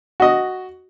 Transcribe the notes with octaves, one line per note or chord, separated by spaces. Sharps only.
F#4 D#5